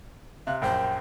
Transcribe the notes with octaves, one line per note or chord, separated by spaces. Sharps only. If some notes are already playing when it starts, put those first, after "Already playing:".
C3 F5 F#6
A#1 F#2 C5 G5